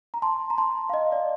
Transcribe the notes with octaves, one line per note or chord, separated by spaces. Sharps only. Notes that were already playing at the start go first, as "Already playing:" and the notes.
A#5
A5 C6
A#5
A5 C6
F5
D#5
D5